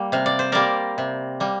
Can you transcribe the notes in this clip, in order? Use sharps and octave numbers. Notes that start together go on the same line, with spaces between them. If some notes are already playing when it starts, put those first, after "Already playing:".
Already playing: G3 A#3
C3 F5
D5
C5
G3 A#3 A#4 D5
C3
G3 A#3